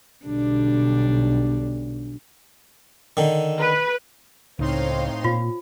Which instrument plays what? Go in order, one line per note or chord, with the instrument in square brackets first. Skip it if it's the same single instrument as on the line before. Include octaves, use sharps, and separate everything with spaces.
[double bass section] B1 [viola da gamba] D3 G3 D4
[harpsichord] D3 D#3
[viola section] B4
[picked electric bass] C#2 [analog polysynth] A2 D#4 C6 [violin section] C4 C#5 F5
[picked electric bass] A#2 [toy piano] F4